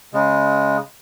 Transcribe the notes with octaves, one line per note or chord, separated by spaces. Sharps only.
C#3 G#3